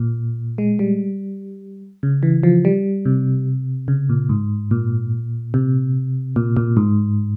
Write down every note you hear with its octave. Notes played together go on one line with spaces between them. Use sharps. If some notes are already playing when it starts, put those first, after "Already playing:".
Already playing: A#2
G#3
G3
C#3
E3
F3
G3
C3
C#3
A#2
G#2
A#2
C3
A#2
A#2
G#2